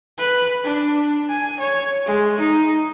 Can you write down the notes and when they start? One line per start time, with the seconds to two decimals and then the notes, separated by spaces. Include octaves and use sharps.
0.19 B4
0.65 D4
1.29 G#5
1.60 C#5
2.06 G#3
2.40 D#4